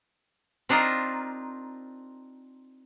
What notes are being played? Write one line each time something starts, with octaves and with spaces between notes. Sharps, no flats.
C4 D4 D#4 F4 A#4